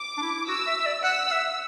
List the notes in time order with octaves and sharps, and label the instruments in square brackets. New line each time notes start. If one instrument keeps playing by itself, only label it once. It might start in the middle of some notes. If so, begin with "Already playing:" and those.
Already playing: [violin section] D6
[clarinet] D4
E4
[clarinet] F#4 [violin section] E6
[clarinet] E5
E5
D5
[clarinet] F#5 [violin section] E6
[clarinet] F#5
E5